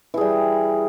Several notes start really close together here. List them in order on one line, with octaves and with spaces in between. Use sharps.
E3 G#4 G3